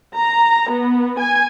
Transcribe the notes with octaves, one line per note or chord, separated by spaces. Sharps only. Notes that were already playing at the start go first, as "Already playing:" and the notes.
A#5
B3
G#5